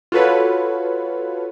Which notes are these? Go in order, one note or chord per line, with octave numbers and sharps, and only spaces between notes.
F4 F#4 A4 B4 C#5